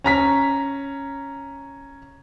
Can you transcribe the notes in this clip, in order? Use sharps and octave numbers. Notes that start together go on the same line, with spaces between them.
C#4 A#5 B6